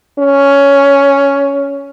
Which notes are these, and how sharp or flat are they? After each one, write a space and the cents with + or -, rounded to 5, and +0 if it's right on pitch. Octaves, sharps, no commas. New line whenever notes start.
C#4 +10